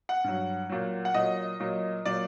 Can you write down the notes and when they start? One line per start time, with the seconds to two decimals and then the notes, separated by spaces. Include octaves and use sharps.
0.09 F#5
0.24 G2 F#3
0.69 A#2 F#3
1.05 F#5
1.14 A#2 F#3 D#5
1.60 A#2 F#3
2.05 A#2 F#3 D5